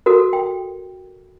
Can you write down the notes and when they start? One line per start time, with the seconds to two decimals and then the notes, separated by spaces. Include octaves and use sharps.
0.06 F#4 A4 A#4
0.33 G5